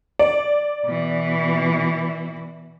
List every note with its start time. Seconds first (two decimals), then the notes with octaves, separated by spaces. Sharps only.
0.19 D5
0.85 B2 E3